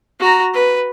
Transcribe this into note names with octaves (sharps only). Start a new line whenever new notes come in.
F#4 A#5
B4